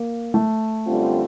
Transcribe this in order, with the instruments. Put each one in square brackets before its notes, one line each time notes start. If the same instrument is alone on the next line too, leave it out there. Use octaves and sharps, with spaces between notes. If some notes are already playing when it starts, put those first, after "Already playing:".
Already playing: [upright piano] A#3
A3
[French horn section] F#2 D3 G3 C4 F4